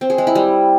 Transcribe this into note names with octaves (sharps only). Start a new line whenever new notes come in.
C4
G#4
G#3
E4
G3